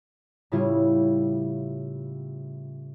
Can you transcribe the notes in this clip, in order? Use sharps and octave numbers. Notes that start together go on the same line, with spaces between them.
A2 C#3 G3 E4 F4